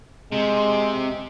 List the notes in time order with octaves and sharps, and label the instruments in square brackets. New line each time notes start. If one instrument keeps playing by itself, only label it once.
[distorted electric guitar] C3 [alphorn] G#3